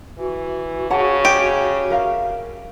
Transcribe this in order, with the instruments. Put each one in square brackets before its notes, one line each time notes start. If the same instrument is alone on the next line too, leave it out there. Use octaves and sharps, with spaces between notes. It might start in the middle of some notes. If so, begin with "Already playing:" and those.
[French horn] E3 [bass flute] F#4
[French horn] C#3 [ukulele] C#5 F#5 A5
[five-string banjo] G4
[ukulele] A#4 E5 F5